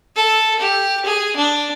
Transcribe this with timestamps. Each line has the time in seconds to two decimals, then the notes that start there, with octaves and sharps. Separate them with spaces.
0.16 A4
0.60 G4
1.05 G#4
1.36 D4